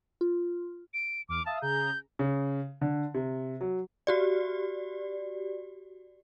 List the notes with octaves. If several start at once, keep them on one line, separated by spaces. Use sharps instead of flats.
F4
D7
E2 D6 F6
E5 F5 A5 D#6
C#3 G#4 A#5 G6
C#3
D3
C3
F#3
F#4 G4 D5